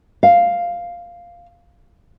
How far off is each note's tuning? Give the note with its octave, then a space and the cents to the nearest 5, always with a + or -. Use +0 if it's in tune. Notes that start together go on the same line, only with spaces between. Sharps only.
F5 +0